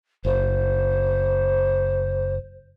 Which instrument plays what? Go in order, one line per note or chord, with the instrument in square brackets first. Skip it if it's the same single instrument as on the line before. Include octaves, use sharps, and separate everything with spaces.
[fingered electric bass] F#1 [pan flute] C5